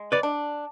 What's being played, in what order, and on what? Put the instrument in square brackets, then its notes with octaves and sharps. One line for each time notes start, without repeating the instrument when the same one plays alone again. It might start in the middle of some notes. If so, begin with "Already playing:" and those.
Already playing: [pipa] G#3
[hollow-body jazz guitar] B4 D5
[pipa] D4